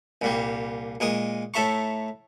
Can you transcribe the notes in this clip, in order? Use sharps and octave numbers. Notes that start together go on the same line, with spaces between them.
C2 A#2 G3
A#2 G#3 A#4 D#6
A2 A4 E5 A#5 C#6